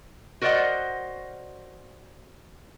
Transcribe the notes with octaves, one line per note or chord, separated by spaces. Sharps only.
F#4 A#4 C5 D5 D#5 F#5